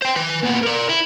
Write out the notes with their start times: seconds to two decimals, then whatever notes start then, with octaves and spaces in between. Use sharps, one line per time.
0.02 C5 G5
0.16 B4 G#5
0.43 A#2 B3
0.63 A#4 D5
0.89 E4